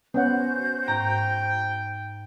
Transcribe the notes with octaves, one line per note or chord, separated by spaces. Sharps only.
B3 C#4 F#4 C5 F#5 G6
G#2 G5 A#5